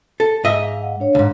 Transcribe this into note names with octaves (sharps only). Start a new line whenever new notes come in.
A4
G#2 D#5 E5
F5
F#5
D4 C#5 F5
C#2 G#2